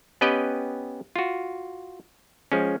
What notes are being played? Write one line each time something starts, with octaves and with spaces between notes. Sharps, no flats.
B3 C#4 G4 B4 D#5 G5
F4 F#4
F3 G#3 C#4